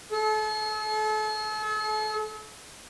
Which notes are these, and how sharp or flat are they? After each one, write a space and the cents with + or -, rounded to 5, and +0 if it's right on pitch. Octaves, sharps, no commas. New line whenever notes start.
A4 -40